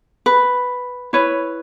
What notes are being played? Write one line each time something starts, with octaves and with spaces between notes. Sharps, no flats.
B4
E4 B4 C#5